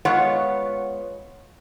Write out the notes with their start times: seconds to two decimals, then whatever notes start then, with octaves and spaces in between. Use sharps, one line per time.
0.05 G#3 B3 F4 C#5 F#5